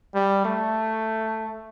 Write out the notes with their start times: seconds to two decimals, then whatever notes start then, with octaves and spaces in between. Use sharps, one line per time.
0.15 G3
0.45 A3